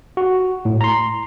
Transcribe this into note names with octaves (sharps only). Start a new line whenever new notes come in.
F#4
A2
A#5 C6